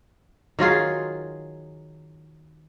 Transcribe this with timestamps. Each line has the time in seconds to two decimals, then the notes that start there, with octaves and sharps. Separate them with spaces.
0.59 D#3 F#3 F4 G#4